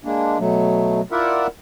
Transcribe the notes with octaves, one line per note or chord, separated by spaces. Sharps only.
G#3 A#3 D4
B2 F#3 A3
E4 F4 A#4 D5 E5 F#5